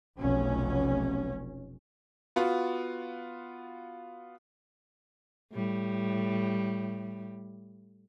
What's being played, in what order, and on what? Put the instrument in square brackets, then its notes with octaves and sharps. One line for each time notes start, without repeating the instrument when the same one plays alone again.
[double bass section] F1 B1 C#4
[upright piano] B3 F4 F#4
[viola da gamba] A2 G3